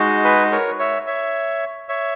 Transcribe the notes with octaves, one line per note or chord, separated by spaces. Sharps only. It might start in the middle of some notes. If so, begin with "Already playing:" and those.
Already playing: G#3 D#4 F#4
G#4 B4
A#4 C#5
C#5 E5
C#5 E5
C#5 E5